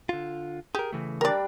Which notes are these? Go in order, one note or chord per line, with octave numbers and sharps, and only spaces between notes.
D3 F4
G4 G#4 A#4
C#3 E3 A3
G3 D4 A#4 D5